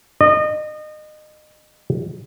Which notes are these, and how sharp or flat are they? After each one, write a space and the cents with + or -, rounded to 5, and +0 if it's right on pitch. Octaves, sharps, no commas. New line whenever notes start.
D#5 -30